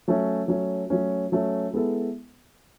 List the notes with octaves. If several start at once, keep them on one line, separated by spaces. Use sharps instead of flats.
F#3 A3 C#4
F#3 A3 C#4
F#3 A3 C#4
F#3 A3 C#4
G#3 B3 E4 A4